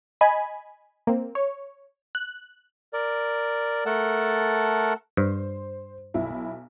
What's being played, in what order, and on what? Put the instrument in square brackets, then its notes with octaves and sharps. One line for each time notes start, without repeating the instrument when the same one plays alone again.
[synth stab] D#5 G#5 B5
A#3 C4
C#5
F#6
[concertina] A#4 D5
A3 A4 A#4 F#5 A5
[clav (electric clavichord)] G2 [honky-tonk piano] C5
[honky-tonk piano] B1 E4